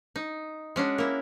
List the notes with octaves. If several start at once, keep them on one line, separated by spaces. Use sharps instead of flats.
D#4
G#3 C#4 D4 F#4
A#3 E4